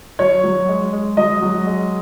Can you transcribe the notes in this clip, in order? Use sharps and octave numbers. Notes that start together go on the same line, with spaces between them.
F#3 C#5
F#3
G#3
G#3
F#3 D#5
F#3
G#3